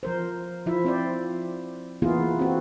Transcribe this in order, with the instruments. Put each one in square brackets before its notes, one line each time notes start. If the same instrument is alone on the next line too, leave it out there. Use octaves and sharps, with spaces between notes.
[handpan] F3 A#4 C5
F3 E4 F4 E5
C4 C5 D5
E3 A#3 B3 E4 F4 G#4
C4 F#4